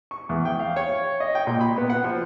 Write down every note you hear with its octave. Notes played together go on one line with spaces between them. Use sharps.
C#6
E2
G5
F5
C#5
D#5
G5
A#2
B5
B3
F#5
F3